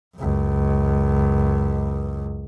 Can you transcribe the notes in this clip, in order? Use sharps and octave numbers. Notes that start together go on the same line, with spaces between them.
C#2 F#2